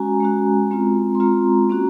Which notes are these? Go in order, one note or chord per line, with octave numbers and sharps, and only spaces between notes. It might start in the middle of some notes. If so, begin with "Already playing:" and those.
Already playing: G#3 C#4 F#4 G#5 A#5
G#3 C#4 F#4
G#3 C4 F4
C6
G#3 C4 F4 A#5
A#3 C#4 F#4